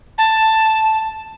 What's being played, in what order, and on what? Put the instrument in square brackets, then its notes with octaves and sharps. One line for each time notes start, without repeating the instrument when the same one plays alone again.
[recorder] A5